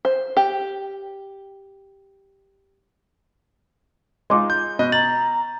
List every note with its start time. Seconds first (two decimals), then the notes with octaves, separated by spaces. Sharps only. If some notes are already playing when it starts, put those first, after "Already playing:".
0.05 C5
0.37 G4
4.30 G#3 D#4 F4 C6 D6
4.50 G6
4.79 B2 D#5 F#6
4.92 A#5 A6 F#7